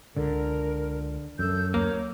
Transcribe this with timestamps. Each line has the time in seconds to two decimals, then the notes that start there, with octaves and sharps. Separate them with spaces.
0.17 C#2 D3 A#4
1.39 F#2 A4 E6 G6
1.74 D2 A#3 C#5